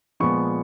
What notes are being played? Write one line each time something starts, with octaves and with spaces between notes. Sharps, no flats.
A#2 F3 G#3 B3 C#6